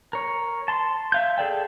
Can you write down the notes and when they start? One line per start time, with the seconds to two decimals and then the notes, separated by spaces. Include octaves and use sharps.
0.13 A#4 C#5
0.68 A5 C6
1.12 E5 F5 G6
1.38 G#4 A4 D5 G5